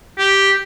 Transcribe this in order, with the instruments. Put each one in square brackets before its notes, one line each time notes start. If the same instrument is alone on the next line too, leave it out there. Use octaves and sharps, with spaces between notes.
[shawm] G4